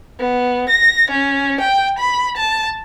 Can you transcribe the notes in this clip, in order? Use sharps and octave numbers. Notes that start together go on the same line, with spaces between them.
B3
A#6
C#4
G5
B5
A5